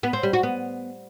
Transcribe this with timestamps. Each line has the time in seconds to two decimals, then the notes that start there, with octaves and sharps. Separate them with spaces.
0.03 B3
0.13 C4
0.23 G3
0.33 F#4
0.43 B3